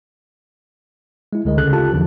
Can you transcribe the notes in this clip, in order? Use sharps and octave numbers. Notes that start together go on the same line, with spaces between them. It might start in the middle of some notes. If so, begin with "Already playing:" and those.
G#3 E4
D2 D3 G#3 A#4 D#5
C2 C#3 A4 F#6
F4 G4 A4 A5
E2 D3 E3 F3